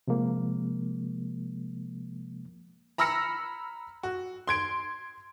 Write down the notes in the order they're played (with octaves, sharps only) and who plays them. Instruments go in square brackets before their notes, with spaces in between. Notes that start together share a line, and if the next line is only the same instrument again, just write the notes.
[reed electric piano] C3 F3 G#3 A#3
[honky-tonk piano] A#5 B5 E6 F6 A#6 C#7
F#4
C6 G#6 D7